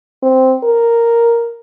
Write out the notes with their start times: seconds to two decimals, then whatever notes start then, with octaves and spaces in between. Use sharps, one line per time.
0.23 C4
0.64 A#4